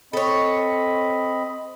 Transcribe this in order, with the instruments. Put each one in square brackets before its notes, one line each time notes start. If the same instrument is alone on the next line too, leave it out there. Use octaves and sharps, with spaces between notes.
[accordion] C4 D#5 B5 [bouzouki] A4 C#5